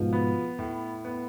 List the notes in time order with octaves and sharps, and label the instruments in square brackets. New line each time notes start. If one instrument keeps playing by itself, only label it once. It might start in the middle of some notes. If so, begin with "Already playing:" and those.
Already playing: [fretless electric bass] G#2 B2 [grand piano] F3
[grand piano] B3
A2
B3